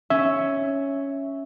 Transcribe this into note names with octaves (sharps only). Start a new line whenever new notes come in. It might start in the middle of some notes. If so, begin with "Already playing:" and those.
C#4 E5